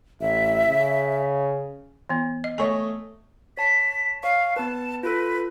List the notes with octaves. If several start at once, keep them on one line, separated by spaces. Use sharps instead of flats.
A1 E5
C#3
E3 B3
D#5
A3 C#5 D#5 G#5
C#5 A5 B6 C7
C#5 F5 C#6
B3 B4 A5
F4 A4 B4